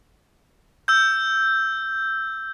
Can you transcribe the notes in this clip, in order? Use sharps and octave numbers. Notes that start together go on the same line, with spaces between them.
E6 G6